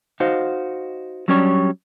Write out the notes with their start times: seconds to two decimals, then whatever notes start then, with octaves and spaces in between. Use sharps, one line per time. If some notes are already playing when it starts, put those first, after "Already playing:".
0.20 D#4 F#4 C5 F5
1.28 F#3 G3 C#4 D4 G4 C#5